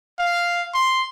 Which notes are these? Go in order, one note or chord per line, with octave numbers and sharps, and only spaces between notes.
F5
C6